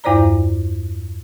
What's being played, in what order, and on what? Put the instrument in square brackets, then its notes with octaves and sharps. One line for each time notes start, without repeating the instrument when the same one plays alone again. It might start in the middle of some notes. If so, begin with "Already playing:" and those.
[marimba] E2 G2 E4 C5 D5 A#5